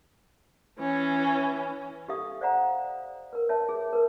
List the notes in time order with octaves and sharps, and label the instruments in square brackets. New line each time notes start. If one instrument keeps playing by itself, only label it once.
[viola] E3 C#4
[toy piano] G4 A4 E5 F5 D#6
C5 D5 F5 F#5 A#5
A#4 B4
C#5 E5 A5
G#4
A#4 B4